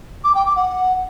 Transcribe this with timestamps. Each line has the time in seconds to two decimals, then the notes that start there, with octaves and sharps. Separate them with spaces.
0.24 D6
0.35 G5
0.46 D6
0.56 F#5